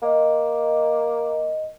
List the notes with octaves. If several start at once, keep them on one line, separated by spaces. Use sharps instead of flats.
A#3 D#5